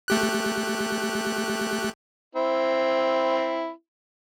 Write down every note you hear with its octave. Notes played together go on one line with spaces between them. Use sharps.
A3 G4 F#6
C4 E4